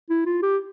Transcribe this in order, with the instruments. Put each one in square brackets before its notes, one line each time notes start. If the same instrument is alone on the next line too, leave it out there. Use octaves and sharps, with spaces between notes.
[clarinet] E4
F4
G4